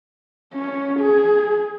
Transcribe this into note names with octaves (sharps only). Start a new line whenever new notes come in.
C#4
G#4